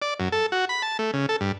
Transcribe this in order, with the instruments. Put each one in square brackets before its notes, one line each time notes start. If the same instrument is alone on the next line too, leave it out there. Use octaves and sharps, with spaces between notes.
[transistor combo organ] D5
F#2
A4
F#4
B5
A5
A3
C#3
A4
G2